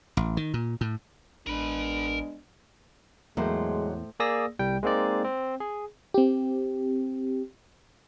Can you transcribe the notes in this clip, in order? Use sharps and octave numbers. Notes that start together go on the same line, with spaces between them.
A1
D#3
A#2
A2
A1 G#3 B3 D4 A#4 B5
E2 A2 F#3 G#3 A#3 C5
A#3 G#4 D5 D#6 E6 A#6
C2 G3 G5
G#3 A#3 C4 D#4 D5
C4
G#4
C4 G4